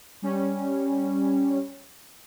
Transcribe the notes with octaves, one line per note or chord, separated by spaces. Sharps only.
G3 C#4